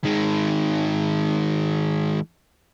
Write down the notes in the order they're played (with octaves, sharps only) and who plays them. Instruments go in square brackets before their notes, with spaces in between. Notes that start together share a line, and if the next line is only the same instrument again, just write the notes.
[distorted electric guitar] D#3 G#3